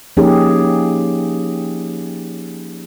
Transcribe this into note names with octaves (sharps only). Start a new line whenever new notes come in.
F3 A#3 C#4 D#4 G4 G#4